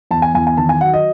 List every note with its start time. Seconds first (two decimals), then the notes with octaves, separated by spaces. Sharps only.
0.11 E2 A5
0.22 G#5
0.35 E2 G#5
0.47 G#5
0.57 D#3 A5
0.69 G#5
0.81 F#3 F#5
0.94 D#5